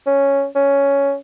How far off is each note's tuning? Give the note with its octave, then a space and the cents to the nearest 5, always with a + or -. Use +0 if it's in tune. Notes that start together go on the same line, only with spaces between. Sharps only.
C#4 +0
C#4 +5